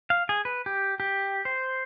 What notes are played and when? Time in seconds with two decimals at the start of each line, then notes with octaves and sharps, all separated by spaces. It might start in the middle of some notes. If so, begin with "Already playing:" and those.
0.10 F5
0.29 G#4
0.45 B4
0.66 G4
1.00 G4
1.45 C5